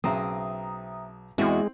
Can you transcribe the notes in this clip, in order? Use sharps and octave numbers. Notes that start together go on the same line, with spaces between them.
B1 C#3 C4 E5 A#5 D#6
E2 G#3 C4 F#4